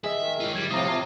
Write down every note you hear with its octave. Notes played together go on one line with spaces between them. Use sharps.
G#4 D#5 E5
D#3
F4 C#5
G3 G#6
A2 C3 F3 F4 A#5 D#6
C3